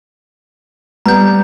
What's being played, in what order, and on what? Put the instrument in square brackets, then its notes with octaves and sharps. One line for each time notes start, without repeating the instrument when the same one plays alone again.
[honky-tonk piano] G3 B3 [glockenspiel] A#5 G6